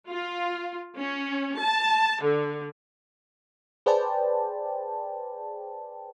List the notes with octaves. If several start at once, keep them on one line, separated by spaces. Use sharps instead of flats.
F4
C#4
A5
D3
G#4 B4 C5 D5 G5 A5